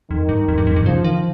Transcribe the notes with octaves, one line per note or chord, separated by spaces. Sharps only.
F2 D#3
G2
F2
G2
F2
G2
C#3 F3
D#3